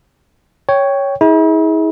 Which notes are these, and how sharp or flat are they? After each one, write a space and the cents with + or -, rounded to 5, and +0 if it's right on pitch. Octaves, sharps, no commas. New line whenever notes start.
C#5 +5 G5 +0
E4 -45 G#4 +0